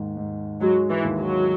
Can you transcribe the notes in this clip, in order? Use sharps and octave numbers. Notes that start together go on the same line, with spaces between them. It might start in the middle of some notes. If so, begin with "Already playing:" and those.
Already playing: D#2 G#2
G#2
F#3 G#3
E3
D#2
F#3